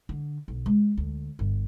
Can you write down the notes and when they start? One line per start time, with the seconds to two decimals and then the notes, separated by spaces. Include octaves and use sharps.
0.09 D3
0.48 B1
0.66 G#3
0.97 D2
1.39 G1